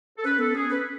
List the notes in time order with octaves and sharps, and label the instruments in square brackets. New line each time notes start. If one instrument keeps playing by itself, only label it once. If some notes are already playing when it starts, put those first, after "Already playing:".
[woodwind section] A4
[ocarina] C#4 [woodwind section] B4
[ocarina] B3 [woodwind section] A4
[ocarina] C#4 [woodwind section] G#4
[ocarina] C#4 [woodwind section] B4